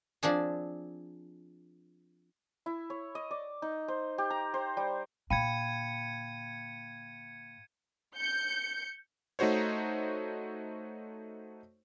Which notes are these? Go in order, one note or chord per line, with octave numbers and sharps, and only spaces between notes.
F3 C4 D4 G#4
E4
C#5
D#5
D5
D#4
C5
G4
A#5
C5
G3
A#2 D3 F5 G5 B5 G#6 C#7 D#7
G6 C#7
A3 D#4 F#4 C5 C#5